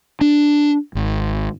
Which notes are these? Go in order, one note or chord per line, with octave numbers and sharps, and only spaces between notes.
D4
G#1